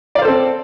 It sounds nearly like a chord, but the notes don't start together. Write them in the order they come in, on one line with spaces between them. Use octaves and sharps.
D5 F5 C5 A4 C4